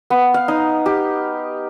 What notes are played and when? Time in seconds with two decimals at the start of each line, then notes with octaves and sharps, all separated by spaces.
0.10 B3
0.34 F5
0.48 D#4
0.86 G4